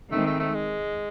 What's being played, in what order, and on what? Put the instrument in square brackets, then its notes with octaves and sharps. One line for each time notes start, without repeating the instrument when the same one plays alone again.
[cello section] D#3 G#3 C4 [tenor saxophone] A3
[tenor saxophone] A3
A3
G#3